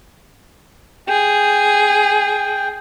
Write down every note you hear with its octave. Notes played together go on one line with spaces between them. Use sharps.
G#4 G5